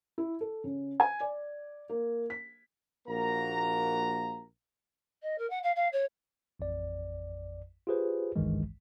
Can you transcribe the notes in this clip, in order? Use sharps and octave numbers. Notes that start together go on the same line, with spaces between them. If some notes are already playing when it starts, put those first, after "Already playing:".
E4
A4
C#3
G#5
D5
A#3
B6
A#1 A#3 F#4 A#4 A#5
D#5
A#4
F#5
F5
F5
C#5
A1 F2 D5
F4 G4 G#4 B4 C5
G#1 C#2 G2 D#3 E3 G#3